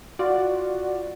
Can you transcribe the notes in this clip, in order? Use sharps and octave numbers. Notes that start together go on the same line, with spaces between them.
F4 F#4 D5